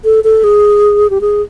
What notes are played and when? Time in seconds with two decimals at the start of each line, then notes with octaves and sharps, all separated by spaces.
0.04 A4
0.24 A4
0.44 G#4
1.10 G4
1.21 G#4